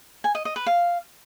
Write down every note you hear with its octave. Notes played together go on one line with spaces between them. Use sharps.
G#5
D#5
D#5
B4
F5